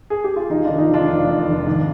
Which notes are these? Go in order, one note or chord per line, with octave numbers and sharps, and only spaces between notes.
G#4
G4
F4
F1 D#4
D#3 D4 F4
D#4
F1 D4 F4
F1
F2
F1
G#1